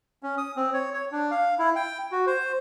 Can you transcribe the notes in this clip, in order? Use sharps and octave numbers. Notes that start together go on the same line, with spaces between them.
C#4
D#6
C4
C#5
C#5
D4
F5
E4
G5
F#4
C5